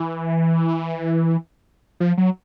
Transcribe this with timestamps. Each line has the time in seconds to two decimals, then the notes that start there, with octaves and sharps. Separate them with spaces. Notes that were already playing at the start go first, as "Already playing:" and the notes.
Already playing: E3
2.00 F3
2.18 F#3